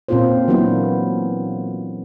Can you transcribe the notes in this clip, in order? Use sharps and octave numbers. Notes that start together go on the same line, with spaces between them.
A#2 C4 C#4 F4 A4 C5
E3 F#3 A#3 B3 D4 E4